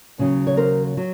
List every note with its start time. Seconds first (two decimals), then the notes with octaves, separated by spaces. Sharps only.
0.18 D#2 C#3 F#3
0.47 C#5
0.57 A#4 C5
0.97 F#3